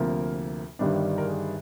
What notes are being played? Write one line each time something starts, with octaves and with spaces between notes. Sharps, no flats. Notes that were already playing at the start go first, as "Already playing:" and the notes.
Already playing: D2 C3 F3 A#3 A#4
G1 G2 D#3 G3 D4
A#4
G#4